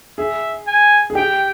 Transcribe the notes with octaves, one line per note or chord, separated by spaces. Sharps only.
G#4 E5
G#5
G#4
G4 G5